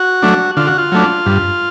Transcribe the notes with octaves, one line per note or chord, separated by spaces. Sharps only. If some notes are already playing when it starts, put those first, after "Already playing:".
Already playing: F#4
F#3 A3 D4
D3 F4
F#4
F4
F#3 A3 D4
G2